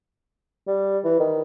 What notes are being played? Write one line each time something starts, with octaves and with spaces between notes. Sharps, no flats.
G3
E3
D#3